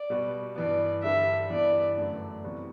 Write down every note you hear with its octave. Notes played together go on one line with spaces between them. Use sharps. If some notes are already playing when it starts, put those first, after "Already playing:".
Already playing: D5
B2 G3 B3 F#4 B4
G2 E3 B3 D5
G2 D3 G3 D4 E5
G2 E3 B3 D5
F#2 D3 A3 D4
C3 E3 G3 B3 F#4